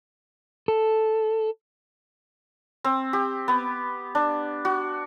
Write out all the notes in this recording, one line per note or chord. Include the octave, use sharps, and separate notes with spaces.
A4
C4
G4
B3
D4
F#4